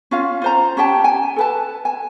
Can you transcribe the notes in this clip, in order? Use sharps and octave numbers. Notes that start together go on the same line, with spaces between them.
C#4 F4 F5
F4 C5 A#5
C#4 G4 G5 A5
G#5
A4 B4 A5
G#5